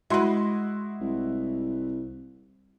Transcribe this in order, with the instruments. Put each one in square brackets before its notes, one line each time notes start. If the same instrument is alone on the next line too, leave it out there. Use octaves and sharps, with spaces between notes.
[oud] G#3 B4 [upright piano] E4 F#4 C6
[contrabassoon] C2